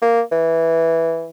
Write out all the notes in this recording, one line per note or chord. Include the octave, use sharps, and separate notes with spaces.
A#3
E3